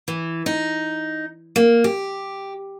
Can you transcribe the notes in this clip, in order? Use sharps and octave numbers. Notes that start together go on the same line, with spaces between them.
E3
D#4
A#3
G4